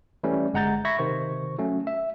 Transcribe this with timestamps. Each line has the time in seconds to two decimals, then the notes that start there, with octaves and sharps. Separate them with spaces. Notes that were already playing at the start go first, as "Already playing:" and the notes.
0.23 E3 G3 A3 C#4
0.54 G1 G#3 F#5 A#5 G6 A6
0.85 E5 B5 C#6 G#6 A#6 B6
0.98 C3 D#3 C5 C#6
1.58 F#3 A3 C#4
1.87 E5